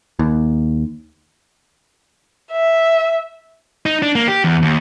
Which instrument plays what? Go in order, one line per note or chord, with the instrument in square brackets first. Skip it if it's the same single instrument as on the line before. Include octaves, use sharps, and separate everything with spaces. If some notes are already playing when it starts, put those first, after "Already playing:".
[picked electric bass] D#2
[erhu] E5
[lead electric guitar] D#4
D4
A#3
G4
E2
D#2